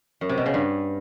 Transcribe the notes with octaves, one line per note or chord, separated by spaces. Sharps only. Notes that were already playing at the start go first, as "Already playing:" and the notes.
F#2
C3
B2
C#3
G2